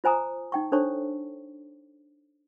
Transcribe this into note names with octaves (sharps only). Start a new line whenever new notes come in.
F4 C5 G#5 A#5 D#6
D#4 G5 C#6
D4 A4 C5 C#5 A5 C#6